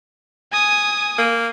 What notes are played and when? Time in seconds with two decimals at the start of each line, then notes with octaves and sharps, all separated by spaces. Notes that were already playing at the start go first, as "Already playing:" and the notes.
0.52 G#5 D#6
1.18 A#3